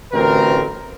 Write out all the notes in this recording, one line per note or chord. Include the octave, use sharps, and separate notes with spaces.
A1 D2 C4 A#4